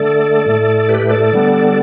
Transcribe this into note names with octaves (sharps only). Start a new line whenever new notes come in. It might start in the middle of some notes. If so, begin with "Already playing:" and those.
Already playing: D3 A3 A4 D5
A2 A3
G4 B4
A4 D5
D3 G3 B3